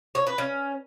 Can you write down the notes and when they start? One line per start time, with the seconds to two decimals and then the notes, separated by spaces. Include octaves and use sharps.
0.15 C#5
0.27 B4
0.38 C#4